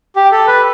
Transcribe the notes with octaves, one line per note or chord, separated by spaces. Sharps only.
G4
A4
B4